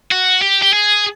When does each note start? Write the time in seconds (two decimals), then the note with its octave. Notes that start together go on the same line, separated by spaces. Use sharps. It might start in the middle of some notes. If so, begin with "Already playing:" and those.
0.12 F#4
0.41 G4
0.62 G4
0.73 G#4